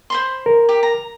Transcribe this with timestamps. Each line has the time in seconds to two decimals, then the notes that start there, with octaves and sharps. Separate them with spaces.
0.10 C5 B5 C6
0.46 A#4
0.69 G4
0.83 A#5